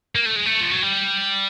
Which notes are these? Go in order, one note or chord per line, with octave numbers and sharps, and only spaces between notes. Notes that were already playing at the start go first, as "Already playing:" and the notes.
A#3
A3
G#3
A3
F3
F#3
G3